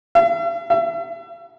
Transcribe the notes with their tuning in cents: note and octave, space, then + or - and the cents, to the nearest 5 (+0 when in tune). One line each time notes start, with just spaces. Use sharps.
E5 +45
E5 +35